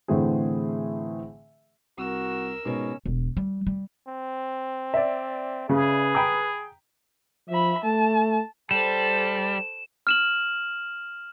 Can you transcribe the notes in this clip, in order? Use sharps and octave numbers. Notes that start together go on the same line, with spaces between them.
A2 D3 E3 A3 C4 G#4
C2 F#4 A#4 E6
G#2 B2 C#4
E1
G3
G3
C4
D5 E5
C#3 G#4 B4
G5 A#5 B5 D#6
F3 E5 B5
A3 A5
G3 A4 C5 E7
F6 E7 F#7